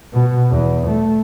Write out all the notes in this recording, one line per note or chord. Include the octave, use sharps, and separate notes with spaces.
B2
E2
A3